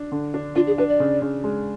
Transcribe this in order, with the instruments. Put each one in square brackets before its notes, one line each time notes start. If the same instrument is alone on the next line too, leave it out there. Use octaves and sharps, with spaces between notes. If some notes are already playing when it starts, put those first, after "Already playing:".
Already playing: [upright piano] D4
D3
D4
[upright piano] D4 [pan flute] F4
[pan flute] G#4
[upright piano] D4 [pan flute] B4
[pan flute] D5
[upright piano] C#3
C#3
G#3